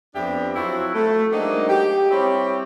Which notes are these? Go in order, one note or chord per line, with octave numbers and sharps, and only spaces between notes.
F2 B3 D4 G4 E5
F3 F#3 C4 E4 F#4
A3
F#3 G#3 A#3 C4 D4 D#4
G4
G3 C4 E4 G4 C#5